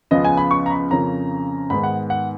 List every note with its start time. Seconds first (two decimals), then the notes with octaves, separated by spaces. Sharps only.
0.11 C#2 C#3 F3 B3 D#5
0.24 G#5
0.37 B5
0.51 C#6
0.66 A#5
0.71 B5
0.91 F2 C#3 F3 A#3 C#4 A#5
1.70 G#2 D#3 G#3 B3 B5
1.83 F#5
2.10 F#5